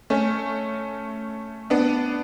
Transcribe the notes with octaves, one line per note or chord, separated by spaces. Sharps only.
A3 C#4
B3 D4